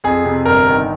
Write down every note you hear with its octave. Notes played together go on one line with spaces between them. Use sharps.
F2 G#4
C3
G1 A#4
D#3